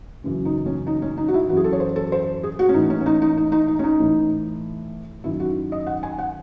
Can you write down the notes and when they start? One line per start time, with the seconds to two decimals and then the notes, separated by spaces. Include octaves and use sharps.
0.24 F#2 C#3 E3
0.45 D#4
0.66 C#4
0.87 D#4
1.02 C#4
1.17 D#4
1.28 F#4
1.34 E4
1.48 E3 F#4
1.53 F#2 G#4
1.64 A4
1.73 C#5
1.80 C5
1.96 A4
2.12 C5
2.43 G#4
2.59 F#4
2.69 C#4
2.74 A2 E3 D#4
2.90 C#4
3.00 C#4
3.06 D#4
3.22 D#4
3.37 D#4
3.52 D#4
3.68 D#4
3.79 C#4
3.84 D#4
4.00 A2 E3
5.24 F#2 D#3 E4
5.40 F#4
5.72 D#5
5.87 F#5
6.03 G#5
6.19 F#5